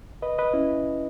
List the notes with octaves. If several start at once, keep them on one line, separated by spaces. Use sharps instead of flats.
B4 D#5
B4 D#5
C#4 E4